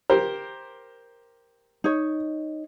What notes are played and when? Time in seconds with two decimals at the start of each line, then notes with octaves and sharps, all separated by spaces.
0.10 G4 A#4 C5
1.84 D#4 C#5